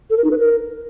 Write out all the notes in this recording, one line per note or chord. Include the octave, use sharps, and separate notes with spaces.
A4
A#4
D#4
B4
A#4